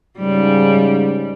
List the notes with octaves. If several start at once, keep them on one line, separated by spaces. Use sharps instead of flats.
G#2 C#3 G3